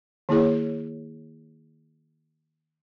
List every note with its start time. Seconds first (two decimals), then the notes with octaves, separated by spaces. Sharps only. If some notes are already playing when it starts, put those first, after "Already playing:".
0.29 D#3 A#3 E4 G#4 C#5